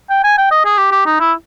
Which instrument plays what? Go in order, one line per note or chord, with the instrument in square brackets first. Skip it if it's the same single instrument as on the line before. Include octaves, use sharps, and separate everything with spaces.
[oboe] G5
G#5
G5
D#5
G#4
G4
G4
D#4
E4